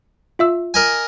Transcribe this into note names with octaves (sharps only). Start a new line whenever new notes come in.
F4 E5 E6
A#4 D#5 G#5